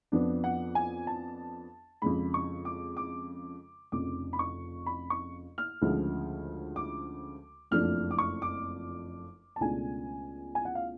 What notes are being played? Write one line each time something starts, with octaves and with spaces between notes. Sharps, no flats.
F2 F3 B3 D4
F#5
G#5
A5
F2 C#3 G#3 B5
C#6
D6
D6
F1 F2 C#3 D6
B5
C#6
B5
C#6
F6
D2 C#3 F3 G#3
D6
F#1 F2 F3 A3 D4 F6
D6
C#6
D6
A5
C#2 B2 A3 D4 G#5
G#5
F#5
F5